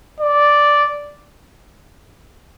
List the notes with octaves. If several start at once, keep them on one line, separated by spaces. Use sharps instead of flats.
D5